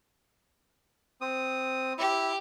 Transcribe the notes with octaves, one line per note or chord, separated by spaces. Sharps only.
C4 D#6
E4 G4